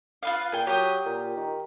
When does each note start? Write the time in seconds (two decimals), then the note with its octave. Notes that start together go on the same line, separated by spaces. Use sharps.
0.23 F4 B4 F5
0.52 A#2 G#4 G5
0.67 F#3 G4 D#6
1.06 A#2
1.37 D#3